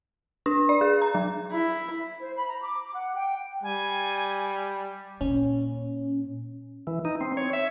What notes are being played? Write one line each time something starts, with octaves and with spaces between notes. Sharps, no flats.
D4
D5
G#4
A#5
F#3
E4
C5
B5
A#5
D6
F#5
G5
G3 G#5
A#2 C#4
E3
D#4
C4
C#5
E5